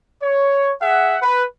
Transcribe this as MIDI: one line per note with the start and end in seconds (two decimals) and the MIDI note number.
0.22 0.72 73
0.82 1.18 68
0.82 1.18 76
0.82 1.18 78
1.22 1.43 71